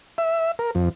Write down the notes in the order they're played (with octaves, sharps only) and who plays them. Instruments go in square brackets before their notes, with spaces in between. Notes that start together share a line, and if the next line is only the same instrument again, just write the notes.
[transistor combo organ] E5
A#4
F2